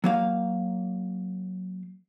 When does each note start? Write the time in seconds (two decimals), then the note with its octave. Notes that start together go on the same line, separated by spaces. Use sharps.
0.04 F#3 A#3 F5